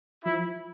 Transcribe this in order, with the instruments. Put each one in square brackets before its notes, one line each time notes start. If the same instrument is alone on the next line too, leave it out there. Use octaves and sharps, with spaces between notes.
[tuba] F3 [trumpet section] E4